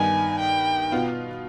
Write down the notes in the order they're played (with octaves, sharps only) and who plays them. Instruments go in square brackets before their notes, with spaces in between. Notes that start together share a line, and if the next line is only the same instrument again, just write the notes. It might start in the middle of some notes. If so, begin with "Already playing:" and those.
Already playing: [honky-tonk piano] G2 D#3 B3 D#4 [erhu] G#5
[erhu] G5
[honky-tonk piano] B2 B3 F4